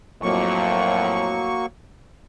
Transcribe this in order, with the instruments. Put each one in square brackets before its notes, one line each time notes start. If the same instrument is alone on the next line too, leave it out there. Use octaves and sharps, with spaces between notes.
[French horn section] F2 A2 [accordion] F#3 A#3 C#6